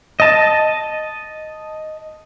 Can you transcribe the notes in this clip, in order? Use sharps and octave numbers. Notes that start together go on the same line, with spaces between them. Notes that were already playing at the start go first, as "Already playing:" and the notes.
D#5 A5